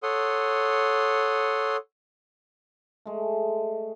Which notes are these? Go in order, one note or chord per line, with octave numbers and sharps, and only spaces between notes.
A4 C#5 F#5 C6 D#6
G#3 A3